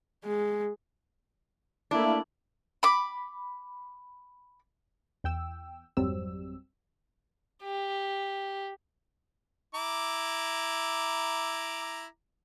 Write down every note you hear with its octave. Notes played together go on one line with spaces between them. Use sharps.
G#3
A3 A#3 D4 E4
B5 D6
E2 G5 E6
G#1 F2 F#3 G3 C4 E6
G4
E4 A#5 D6